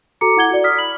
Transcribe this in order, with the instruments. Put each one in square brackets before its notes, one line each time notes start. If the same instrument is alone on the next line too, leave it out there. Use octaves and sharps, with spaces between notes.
[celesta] F#4 A4 A#5 D6 C#7
E4 F#5 G#6 G7
F#4 D5
D#6 F6 B6
B5 F#7